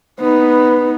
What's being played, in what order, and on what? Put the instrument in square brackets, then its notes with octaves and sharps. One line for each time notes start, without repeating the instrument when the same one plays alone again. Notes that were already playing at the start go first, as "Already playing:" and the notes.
[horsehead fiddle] B3 D#4 [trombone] B4